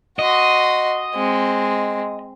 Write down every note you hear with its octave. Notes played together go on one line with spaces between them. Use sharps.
F#4 D#5 C6
G#3 C4